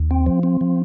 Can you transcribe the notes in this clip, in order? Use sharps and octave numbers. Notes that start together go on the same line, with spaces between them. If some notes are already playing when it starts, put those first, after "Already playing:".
Already playing: D#2
C4
F3
C4
F3